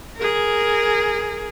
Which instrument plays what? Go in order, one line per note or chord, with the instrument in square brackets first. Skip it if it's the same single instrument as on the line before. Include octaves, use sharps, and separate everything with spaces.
[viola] G#4 A#4